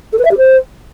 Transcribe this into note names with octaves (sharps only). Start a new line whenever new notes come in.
A4
B4
E5
G4
C5